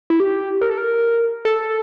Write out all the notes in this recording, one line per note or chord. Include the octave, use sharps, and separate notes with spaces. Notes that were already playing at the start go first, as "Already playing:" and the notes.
E4
G4
A#4
A4
A#4
A4